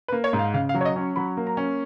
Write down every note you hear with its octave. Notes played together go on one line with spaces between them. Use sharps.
B4
A#3
C#5
G#2
F5
C#3 F5
F5
F#3
C#5
D#5
C#4
C#6
F#3 B5
A#3
A#5
C#4